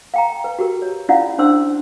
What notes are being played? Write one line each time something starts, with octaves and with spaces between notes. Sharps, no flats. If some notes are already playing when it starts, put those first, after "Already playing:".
F5 G5 A#5
B4
F#4 G4 A#4
C#5
C#4 E4 F4 D5 F5 F#5
C#4 D4 C5 C6 E6